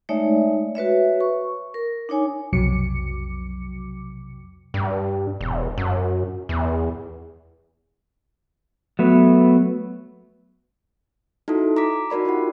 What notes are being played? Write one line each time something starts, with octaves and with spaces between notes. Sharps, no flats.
G#3 A3 D#4 C#5 D5 E5
F#4 B4 C#5 E5
C#6
A#4
D4 D#4 C#5 G#5
B1 F2 C3 F#3 D6 C#7
G2
E1
F#2
E2
F#3 A3 B3
D#4 E4 F#4 A4
A#5 D6 B6
D#4 F#4 A#4 D5 B5
E4 F4 G4 F#5